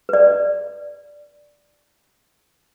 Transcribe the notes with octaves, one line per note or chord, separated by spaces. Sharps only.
B4 D5